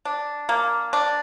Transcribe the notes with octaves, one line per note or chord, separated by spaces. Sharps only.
D4
A#3
D4